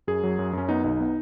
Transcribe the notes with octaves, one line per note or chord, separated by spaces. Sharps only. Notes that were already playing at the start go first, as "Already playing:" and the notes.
F#2 G#4
F#3
F#2
F#2 C#4
B3 D#4
B1 D#4
B3